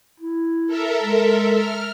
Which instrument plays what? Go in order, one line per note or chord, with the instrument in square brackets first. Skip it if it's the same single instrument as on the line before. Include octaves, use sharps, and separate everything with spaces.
[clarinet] E4
[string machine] A4 A#4 E5
[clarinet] G#3
[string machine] F6